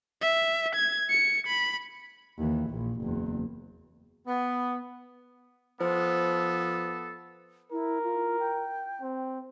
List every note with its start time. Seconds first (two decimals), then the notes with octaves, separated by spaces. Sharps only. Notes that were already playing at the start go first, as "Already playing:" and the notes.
0.21 E5
0.75 G#6
1.10 C#7
1.47 B5
2.38 D#2 E3
2.71 A#1
3.02 F#1 E2
4.27 B3
5.80 F3 B3 A4 C5
7.72 E4 A#4
8.03 F4
8.39 G5
9.01 C4